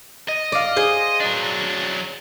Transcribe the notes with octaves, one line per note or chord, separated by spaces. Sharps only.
D#5
D5 F5
G#4 C5
F#3 D4